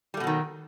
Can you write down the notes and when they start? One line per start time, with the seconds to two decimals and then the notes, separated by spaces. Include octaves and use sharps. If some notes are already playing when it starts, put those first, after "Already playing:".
0.14 G3
0.17 A3
0.20 B2
0.24 F#3
0.27 D#3